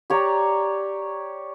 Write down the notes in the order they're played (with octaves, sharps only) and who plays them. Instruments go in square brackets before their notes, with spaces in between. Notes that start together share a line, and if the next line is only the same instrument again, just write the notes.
[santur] G4 C#5 D5 A#5